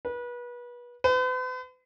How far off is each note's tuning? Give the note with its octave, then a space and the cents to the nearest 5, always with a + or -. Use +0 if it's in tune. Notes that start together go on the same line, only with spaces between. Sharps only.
B4 -30
B4 +45